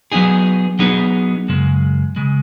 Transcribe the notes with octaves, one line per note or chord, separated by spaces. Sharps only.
F#3 B3 D#4 G#4
F#3 B3 D#4 G#4
F#2 C#3 G#3
C#3 G#3